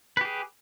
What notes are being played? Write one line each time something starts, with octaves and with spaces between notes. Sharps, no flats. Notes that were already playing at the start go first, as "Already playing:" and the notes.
G4 G#4 B4